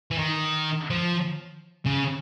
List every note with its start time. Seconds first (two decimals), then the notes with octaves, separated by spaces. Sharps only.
0.11 E3
0.19 D#3
0.90 F3
1.86 C#3